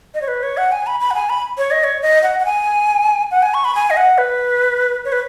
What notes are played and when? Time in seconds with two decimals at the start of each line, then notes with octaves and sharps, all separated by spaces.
0.14 D#5
0.22 C#5
0.28 B4
0.43 C#5
0.57 F#5
0.72 G#5
0.87 B5
1.00 B5
1.11 F#5
1.15 G#5
1.29 B5
1.58 C#5
1.71 D#5
1.84 C#5
2.02 D#5
2.23 F#5
2.39 F#5
2.45 G#5
3.31 F#5
3.43 G#5
3.54 C#6
3.65 B5
3.75 G#5
3.90 D#5
3.97 F#5
4.18 B4
5.05 C#5
5.12 B4